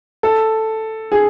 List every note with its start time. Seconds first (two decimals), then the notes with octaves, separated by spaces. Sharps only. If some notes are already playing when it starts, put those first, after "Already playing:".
0.23 A4
1.12 G#4